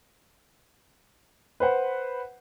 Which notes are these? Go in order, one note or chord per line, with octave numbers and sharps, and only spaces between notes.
B4 C5 F#5